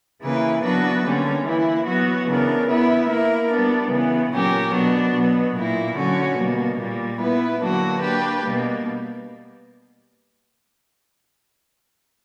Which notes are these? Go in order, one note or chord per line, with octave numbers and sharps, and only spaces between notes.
C#3 E3 A#3 E4 B4
F#3 B3 D4 F#4 B4
D3 G3 A#3 C#4
E3 A#3 E4
F#3 B3 F#4
C#3 E3 B3 D4 A#4
B3 E4 B4 E5
A#3 E4 A#4
G3 B3 D4
C#3 E3 B3
A#2 F#3 C#4 G4 A#4
B2 F#3 B3 D4 F#4
B2 F#3 B3
A#2 A#3 E4
D3 F#3 C#4 F#4
B2 G3 A#3
A#2 G3 A#3
B3 E4 B4
D3 F#3 A#3 D4 F#4
A#3 D4 G4 B4
B2 G3 A#3